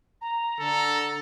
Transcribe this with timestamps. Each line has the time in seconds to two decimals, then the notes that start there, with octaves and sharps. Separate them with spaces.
0.21 A#5
0.60 D3 A4